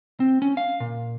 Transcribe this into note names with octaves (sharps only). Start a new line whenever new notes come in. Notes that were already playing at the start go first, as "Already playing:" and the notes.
C4
C#4
F5
A#2